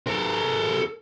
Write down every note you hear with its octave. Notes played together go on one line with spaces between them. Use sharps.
A4 A#4